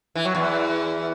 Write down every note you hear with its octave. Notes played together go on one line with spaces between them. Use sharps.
E3
F#3
E2 E3